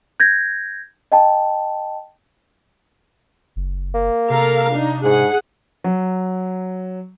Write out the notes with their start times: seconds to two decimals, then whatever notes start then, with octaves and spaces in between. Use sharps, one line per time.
0.20 G6 G#6 A#6
1.12 D#5 G5 A5
3.56 F#1
3.94 A#3
4.30 C3 A4 A#4 F5
4.72 D4 D#4
5.04 G#2 G#4 F#5
5.84 F#3